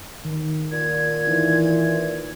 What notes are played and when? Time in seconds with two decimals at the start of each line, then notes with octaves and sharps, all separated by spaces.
0.25 D#3
0.72 A#2 G#6
1.27 E3 D#4